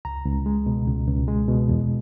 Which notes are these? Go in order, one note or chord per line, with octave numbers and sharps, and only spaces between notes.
C#2 A#5
C#2
G#3
B2
C#2
C#2
G#3
B2
E2